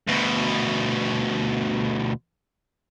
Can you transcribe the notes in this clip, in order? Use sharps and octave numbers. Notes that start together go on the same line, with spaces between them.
D2 B2